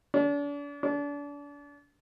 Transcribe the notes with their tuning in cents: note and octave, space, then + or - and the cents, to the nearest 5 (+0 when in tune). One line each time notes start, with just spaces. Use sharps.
D4 -40
D4 -35